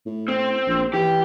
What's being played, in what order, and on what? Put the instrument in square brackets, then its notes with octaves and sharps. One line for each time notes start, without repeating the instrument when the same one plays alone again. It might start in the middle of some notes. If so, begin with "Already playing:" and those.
[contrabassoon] A2
[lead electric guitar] C4
[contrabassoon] A#1
[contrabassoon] E3 [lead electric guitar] G4